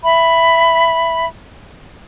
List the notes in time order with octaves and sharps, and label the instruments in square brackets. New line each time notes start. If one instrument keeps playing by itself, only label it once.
[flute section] E5 B5